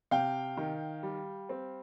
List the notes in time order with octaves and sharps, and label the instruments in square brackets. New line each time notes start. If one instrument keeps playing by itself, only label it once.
[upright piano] C3 F5 G5
D#3
G3
C4